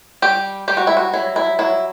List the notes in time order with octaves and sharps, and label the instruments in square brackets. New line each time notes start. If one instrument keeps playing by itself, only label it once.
[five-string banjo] G3 G4
G3 G4
F#4
E4
F#4
F#3 E4
E4
F#3 E4